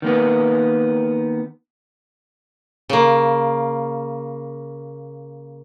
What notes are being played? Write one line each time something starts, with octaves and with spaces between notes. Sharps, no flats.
D#3 A#3 B3
C#3 A#3